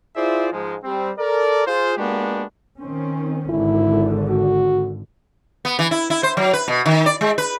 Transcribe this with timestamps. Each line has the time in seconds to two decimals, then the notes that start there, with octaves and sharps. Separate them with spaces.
0.16 E4 F4 G#4 C5 D5 E5
0.52 G#2 F3 G#3
0.84 G3 C4
1.19 A4 A#4 D5
1.67 F4 G#4 C5
1.98 G#3 A#3 B3 D4 F#4 G4
2.78 D#3 C4 C#4
3.50 G#1 D3 E4
4.30 F#4
5.65 B3
5.79 E3
5.91 E4
6.10 E4
6.23 C5
6.37 F#3
6.53 B4
6.68 B2
6.86 D#3
7.06 D5
7.21 G#3
7.38 B4